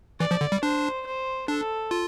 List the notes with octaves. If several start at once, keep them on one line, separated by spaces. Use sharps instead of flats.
E3 D5
F3
D3
G3
D4 C5
C5
D4 A4
F4